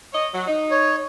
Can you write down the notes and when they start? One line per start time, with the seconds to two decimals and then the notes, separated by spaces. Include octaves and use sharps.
0.13 C#5 D#5
0.33 F#3
0.46 D#4
0.71 C#5